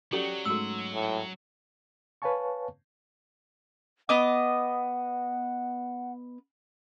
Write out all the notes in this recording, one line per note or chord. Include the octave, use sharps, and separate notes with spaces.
F#3 C#4 F#4 G4 A4 D5 C#6
G#2 A3 F#4 E6
A2
B4 C#5 F5 G#5 A5 C#6
B3 D#5 F#5 D6